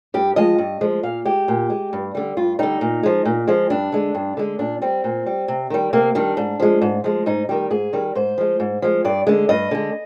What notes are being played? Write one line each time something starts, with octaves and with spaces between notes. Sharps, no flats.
G2 G4
F3 G#3 D#5
G2
F3 G#3
A#2 F5
G#3 G4
A#2
G#3
G2
D3 G3
G2 F4
D3 G3 D#4
A#2
F3 G#3
A#2
F3 G#3
G2 D4
D3 G#3
G2
D3 G#3
A#2 D4
G3 C4
A#2
G3
C3
D#3 G3
C3 A#3
D#3 G3 D4
G#2
F3 G#3
G#2
F3 G#3
G#2 D#4
D#3 G3 G4
G#2 G#4
D#3 G3
G#2 C5
F3 G#3
G#2
F3 G#3
G2 D5
D3 G#3
G2 D#5
D3 G#3